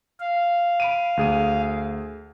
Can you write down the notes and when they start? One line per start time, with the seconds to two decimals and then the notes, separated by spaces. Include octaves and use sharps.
0.20 F5
0.80 B5 D7 D#7
1.17 D2 G#4 D#7